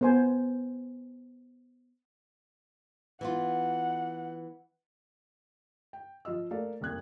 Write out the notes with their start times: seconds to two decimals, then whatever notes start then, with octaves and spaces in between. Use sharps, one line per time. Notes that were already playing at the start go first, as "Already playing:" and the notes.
0.01 B3 C5 G#5
3.21 E3 B3 F4 F#5
5.93 G5
6.25 F3 F4 D#5 E6
6.51 A3 A#3 A4 A#4 D5 F5
6.81 F1 C2 A#3 F#6 G#6